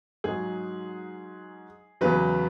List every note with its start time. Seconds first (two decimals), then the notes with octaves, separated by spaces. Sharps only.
0.24 G#2 F#3 G#4
2.01 E2 C#3 F#3 B4